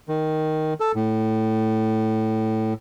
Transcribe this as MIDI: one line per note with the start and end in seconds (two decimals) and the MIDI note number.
0.09 0.74 51
0.80 0.92 69
0.96 2.74 45